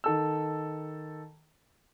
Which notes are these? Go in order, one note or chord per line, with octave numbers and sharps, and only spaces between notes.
D#3 A4 E6